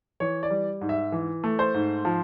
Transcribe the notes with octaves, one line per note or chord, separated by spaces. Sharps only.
E3 C#5
D5
G3
G#2
E5
E3
A3
C5
G#2
F3